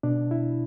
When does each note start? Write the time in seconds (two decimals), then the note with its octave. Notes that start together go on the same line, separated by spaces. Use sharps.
0.03 B2 D4
0.31 E4